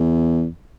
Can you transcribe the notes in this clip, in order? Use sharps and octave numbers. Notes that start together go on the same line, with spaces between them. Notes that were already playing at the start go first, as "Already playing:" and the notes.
Already playing: E2